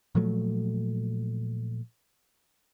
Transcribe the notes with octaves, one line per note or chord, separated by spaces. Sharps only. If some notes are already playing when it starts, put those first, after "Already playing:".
A#2 F3 F#3 A3